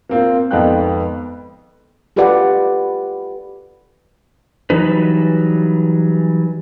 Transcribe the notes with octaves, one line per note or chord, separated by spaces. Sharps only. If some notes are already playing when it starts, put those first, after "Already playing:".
A#3 C4 F4
G#1 F2 B3 F5 G5 F#6
F4 G4 A4 B4 D5 F#5
E3 F#3 G3 D#4 B4